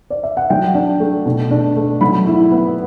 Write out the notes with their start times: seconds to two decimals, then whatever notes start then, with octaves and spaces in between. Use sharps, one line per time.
0.10 D5
0.23 E5
0.37 F#5
0.50 F#3 G5
0.75 D4
1.00 A3
1.26 B2
1.51 D4
1.76 A3
2.01 F#3 B5
2.27 E4
2.52 B3